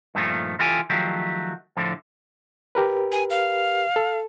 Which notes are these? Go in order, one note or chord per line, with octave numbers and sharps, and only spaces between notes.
G2 A#2 D#3 F3 A3
E3 F4 G4 A4 G#5
D#3 F3 F#3 A3 G4
A2 D3 F3
G4 A#4 B4
G#5
F5
A4